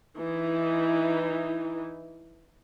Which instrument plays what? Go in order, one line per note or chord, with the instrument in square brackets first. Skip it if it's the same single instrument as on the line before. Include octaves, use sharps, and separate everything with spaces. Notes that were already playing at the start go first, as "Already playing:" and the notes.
[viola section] E3 D#4